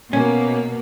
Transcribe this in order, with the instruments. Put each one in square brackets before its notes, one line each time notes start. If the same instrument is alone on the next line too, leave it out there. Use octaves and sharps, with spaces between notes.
[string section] B2 A#3 [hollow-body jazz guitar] C#4